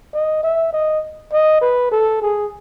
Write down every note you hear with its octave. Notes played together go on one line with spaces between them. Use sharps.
D#5
E5
D#5
D#5
B4
A4
G#4